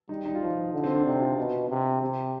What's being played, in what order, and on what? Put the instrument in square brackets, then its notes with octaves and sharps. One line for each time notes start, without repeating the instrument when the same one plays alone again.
[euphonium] G3 [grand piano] D#4
[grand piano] D#4
F4
[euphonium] F3 [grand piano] D#4
[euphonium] D3
[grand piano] C4
D4
[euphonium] C3 [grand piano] D#4
[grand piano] F4
[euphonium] B2
C3
[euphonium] C3 [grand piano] G4